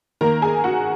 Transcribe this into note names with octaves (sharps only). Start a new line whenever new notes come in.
D#3 A#3 A#4 A#5
G#4 G#5
F#4 F#5